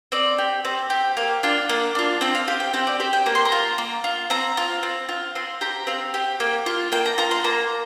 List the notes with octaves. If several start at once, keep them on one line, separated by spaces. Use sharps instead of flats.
C4 D5
G4
C4
G4
A#3 F5
D4 F4
A#3
D4 F4
C4 G5
F5
G4 F5
G5
C4 G5
D5
G4 C5
G5
A#3 A#5
C6
A#5
F4
A#3
F4
C4 A#5
F4
C4
F4
C4 C6
G4 A#5
C4 F5
G4
A#3
F4
A#3 G5
A#5
F4 A#5
C6
A#3 A#5